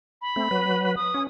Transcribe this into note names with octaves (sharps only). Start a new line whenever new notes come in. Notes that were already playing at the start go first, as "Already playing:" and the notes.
B5
A3 C4
F#3 B4
D#6
C#4